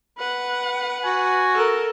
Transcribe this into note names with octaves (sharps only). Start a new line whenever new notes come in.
B4 F#5
F#4 G#5
A4 A#4